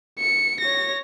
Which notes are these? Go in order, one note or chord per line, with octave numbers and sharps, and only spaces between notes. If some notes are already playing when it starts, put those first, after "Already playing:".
C#7
C#5 A#6